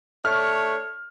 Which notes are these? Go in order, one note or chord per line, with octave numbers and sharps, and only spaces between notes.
A3 D4 C#5 F6